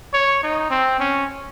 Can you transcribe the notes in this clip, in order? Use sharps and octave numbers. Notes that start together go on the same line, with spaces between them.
C#5
D#4
C4
C#4